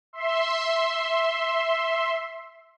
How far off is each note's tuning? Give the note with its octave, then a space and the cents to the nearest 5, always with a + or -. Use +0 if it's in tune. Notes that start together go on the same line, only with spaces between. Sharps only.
E5 +0 C6 +10